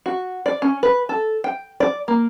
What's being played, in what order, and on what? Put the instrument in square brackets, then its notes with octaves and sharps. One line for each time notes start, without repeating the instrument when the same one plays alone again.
[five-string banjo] F#4
D5
C#4
B4
A4
G5
D5
A#3